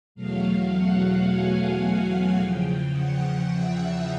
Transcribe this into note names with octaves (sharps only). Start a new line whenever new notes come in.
E2 B2 F#3 A3 F5
F#5
G#5
E2 C#3 F3 G5
F#5
E5